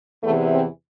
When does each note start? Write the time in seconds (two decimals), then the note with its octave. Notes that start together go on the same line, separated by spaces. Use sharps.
0.23 E2 C3 E3 A3
0.53 C4